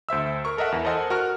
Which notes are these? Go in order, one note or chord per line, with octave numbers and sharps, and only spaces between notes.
D2 C5 E5 E6
A#4 C#6
A4 A#4 D#5 E5 F#5
E2 E4
A4 A#4 C5 D#5 F#5 G#5
F#4 A#4 C#6 F6